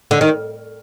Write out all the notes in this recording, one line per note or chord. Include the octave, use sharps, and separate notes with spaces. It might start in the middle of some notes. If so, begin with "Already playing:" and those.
D3
D#3